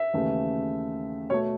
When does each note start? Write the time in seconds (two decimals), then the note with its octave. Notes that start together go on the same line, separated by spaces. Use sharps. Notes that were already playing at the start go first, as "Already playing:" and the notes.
Already playing: E5
0.13 D#2 C#3 E3 A3
1.30 B2 A3 C#5